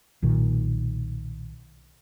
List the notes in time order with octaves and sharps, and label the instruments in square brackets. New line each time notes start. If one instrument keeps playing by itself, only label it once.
[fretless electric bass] B1 A#2 D#3